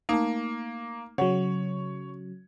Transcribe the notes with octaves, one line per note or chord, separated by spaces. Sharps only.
A3 A#3 D#4
C#3 F#3 C#5 F#5